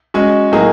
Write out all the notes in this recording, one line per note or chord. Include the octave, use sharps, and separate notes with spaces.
G#3 C#4 F#4
A2 F#3 A#3 D#4 G#4